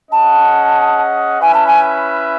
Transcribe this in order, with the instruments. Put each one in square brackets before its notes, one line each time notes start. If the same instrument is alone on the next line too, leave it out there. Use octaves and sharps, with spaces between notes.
[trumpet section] C#4 G#4 D#5 F#5 [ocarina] A5
[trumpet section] C#4 E4 B4 E5 [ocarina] G#5
[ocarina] A5
G#5